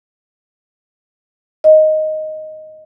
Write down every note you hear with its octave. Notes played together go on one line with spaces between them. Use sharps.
D#5